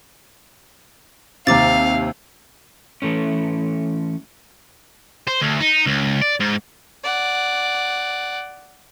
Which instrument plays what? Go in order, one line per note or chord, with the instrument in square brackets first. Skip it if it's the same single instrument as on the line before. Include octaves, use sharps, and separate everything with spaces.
[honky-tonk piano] D#2 C3 [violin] F5 [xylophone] A#5 D6 A6
[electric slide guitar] E3 A3 C#4
[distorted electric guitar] C5
D2
D#4
C#2
D5
G#2
[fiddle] D5 F#5